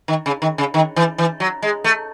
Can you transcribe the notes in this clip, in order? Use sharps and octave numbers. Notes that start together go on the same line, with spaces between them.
D#3
C#3
D#3
C#3
D#3
E3
E3
F#3
G#3
A3